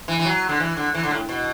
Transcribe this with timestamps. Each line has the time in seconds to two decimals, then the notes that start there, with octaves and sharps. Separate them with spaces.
0.08 E3
0.19 E3
0.25 F#3
0.49 D3
0.60 E3
0.77 D3
0.94 E3
1.04 D3
1.11 A2
1.29 B2